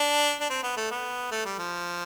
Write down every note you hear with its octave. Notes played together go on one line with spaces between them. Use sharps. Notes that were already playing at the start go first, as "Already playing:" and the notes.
Already playing: D4
D4
C4
B3
A3
B3
A3
G3
F3